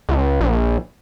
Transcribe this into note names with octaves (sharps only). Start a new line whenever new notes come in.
C#2
A#1